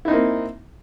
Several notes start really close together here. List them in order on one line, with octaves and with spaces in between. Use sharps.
E4 D#4 C4 A#3